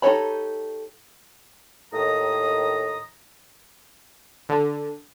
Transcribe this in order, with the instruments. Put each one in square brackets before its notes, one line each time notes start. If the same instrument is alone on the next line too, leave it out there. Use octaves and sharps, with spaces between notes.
[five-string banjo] D#4 G4 A4 C#5 B5
[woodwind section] D#2 A2 D#3 A#5 D#6
[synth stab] D3